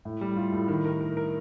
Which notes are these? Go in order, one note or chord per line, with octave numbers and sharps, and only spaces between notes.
A2
G3
F4
A2
D#3
A#4
A#4
A#4